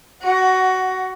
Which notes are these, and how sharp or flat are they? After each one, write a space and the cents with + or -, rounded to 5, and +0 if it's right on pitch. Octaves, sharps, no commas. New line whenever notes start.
F#4 +15 F#5 +0